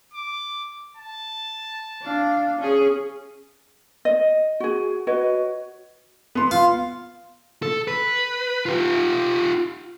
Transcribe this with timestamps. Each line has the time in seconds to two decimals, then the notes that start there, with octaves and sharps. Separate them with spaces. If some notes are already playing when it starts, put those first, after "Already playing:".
0.14 D6
0.97 A5
2.02 D4 F5
2.59 C#4 G#4
4.05 D#5
4.60 F#4 G#4
5.07 F#4 B4 C#5 D#5
6.35 B3 C6
6.51 F4
7.63 A4
7.88 B4
8.66 F4 G4